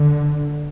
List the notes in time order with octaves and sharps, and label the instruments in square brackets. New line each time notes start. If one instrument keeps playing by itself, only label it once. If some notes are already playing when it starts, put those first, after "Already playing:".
Already playing: [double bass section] D3